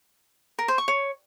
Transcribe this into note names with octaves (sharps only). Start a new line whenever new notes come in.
A#4
C5
C#6
C#5